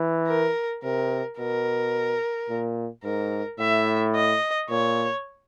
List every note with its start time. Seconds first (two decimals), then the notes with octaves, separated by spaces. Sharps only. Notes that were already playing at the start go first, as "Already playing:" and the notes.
Already playing: E3
0.28 A#4
0.83 C3 A#4
1.39 B2 A#4
2.50 A#2
3.04 G#2 A#4
3.59 A2 E5
4.15 D#5
4.70 A#2 C#5